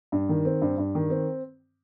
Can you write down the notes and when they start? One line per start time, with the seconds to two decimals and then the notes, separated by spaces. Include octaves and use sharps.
0.12 G2
0.29 D#3
0.45 C4
0.62 G2
0.78 G2
0.95 D#3
1.10 C4